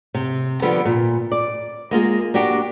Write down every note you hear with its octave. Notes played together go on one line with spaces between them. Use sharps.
C3
D3 F3 G3 B3
A#2
D5
G#3 A#3 F4 G#4
A#3 D4 F#4 G4